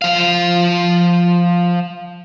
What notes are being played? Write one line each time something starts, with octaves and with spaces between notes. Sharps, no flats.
F3 F5